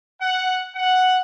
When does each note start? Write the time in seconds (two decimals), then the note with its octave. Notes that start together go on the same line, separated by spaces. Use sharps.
0.20 F#5
0.74 F#5